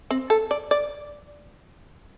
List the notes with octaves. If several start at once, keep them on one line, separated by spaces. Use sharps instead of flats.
C4
A4
D5
D5